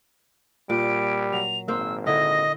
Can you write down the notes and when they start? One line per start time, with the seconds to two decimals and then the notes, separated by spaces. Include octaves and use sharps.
0.70 A#2 G3 D7
1.33 F#3 F7
1.68 G#1 A#3 C5 E6
2.06 D3 E4 D#5 A#6